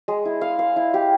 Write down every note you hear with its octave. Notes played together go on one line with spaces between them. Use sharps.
G#3
E4
F5
F5
E4
G4